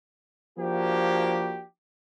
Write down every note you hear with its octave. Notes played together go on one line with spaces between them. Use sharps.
F3 A#3 D4 F#4 G4